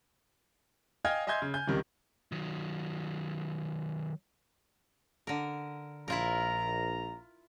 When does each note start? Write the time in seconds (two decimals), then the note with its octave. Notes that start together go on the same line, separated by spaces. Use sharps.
1.05 D#5 F5 G5 G#5 F6 G#6
1.27 D#5 E5 G#5 C6 G6 G#6
1.42 C#3
1.54 G#5 G6
1.67 C#2 C3 D#3 G3
2.32 D#3 F#3
5.27 D3 A#4
6.08 A#1 E4 F4 A#4 A#5